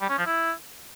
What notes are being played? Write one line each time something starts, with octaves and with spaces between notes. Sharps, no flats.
G3
C#4
F3
E4